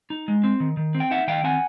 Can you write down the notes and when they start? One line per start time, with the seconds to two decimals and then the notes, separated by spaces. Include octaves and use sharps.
0.10 D#4
0.28 G#3
0.44 C4
0.60 D#3
0.77 D#3
0.95 C4
1.00 G5
1.11 D#4 E5 F#5
1.27 D#3 F5 G5
1.44 C4 F#5 G#5